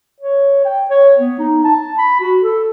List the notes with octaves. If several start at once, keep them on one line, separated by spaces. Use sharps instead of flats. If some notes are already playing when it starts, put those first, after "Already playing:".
C#5
G5
C#5
B3
D#4
A5
B5
F#4
A4